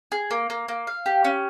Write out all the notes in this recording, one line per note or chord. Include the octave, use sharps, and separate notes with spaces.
G#4
A#3
A#3
A#3
F5
G4
C#4